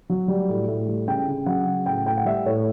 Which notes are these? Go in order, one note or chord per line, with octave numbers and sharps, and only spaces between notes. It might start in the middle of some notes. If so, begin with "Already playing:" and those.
F#3
G3
A2
A2
G3
C#3 G5
C#3
F#3 F#5
C#3
A2 G5
A2 G5
F#5
G3 E5
A2 C#5